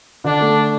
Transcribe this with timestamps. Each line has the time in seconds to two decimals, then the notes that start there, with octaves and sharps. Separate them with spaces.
0.24 D3 D4
0.41 A3